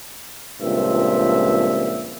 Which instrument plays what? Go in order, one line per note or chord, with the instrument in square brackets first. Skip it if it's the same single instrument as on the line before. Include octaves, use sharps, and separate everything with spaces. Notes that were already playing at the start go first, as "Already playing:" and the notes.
[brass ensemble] C#2 G2 A#2 F3 C4 E5